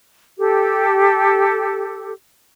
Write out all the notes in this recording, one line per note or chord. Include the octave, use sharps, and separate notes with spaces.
G4 A4